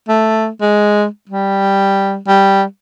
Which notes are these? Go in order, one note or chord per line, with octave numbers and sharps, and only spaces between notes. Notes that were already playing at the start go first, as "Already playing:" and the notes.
A3
G#3
G3
G3